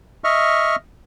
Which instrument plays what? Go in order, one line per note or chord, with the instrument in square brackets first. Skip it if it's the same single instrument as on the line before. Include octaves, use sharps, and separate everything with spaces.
[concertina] D#5 E5 C#6 F6